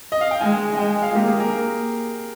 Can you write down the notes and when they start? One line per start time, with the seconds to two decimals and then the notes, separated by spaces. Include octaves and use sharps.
0.12 D#5
0.21 F5
0.31 G5
0.41 G#3 G#5
0.78 G#3 G5
0.90 G#5
1.02 F5
1.11 F4
1.15 A#3 G4
1.27 G#4
1.40 A#4